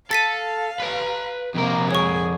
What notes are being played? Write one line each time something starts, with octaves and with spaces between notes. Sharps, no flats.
A4 F5 A6 B6 D#7
B4 A#5
F2 C3 A#3 A#4
G#4 C#5 C#6